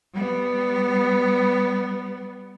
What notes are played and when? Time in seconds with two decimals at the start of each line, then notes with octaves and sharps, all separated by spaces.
0.14 G3 B3